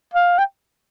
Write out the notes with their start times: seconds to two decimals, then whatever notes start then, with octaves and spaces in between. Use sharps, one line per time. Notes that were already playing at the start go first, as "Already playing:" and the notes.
0.14 F5
0.38 G5